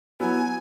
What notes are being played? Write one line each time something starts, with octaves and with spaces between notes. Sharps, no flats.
F#3 B3 E4 G#5